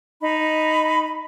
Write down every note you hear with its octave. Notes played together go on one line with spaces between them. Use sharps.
D#4 B5